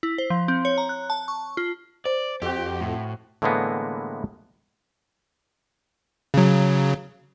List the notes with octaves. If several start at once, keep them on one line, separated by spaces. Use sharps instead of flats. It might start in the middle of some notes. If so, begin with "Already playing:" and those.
E4
C5
F3
C4
C#5
A#5
F#6
A5
C#6
F4
C5 D5
F2 C4 F#4 G4
A2
A2 D3 E3 G#3 A#3 B3
C#3 F#3